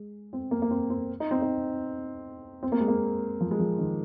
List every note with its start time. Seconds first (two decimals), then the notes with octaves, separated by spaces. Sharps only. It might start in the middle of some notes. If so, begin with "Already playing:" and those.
Already playing: G#3
0.33 C4
0.51 A#3
0.62 A#3
0.71 C4
0.90 C4
1.20 D#4
1.31 C4
1.42 D#4
2.63 C4
2.72 A#3
2.80 G#3
2.88 A#3
3.40 F3
3.51 G#3
3.59 F3
3.79 D#3